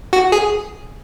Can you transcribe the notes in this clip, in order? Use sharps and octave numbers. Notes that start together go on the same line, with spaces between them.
F#4
G#4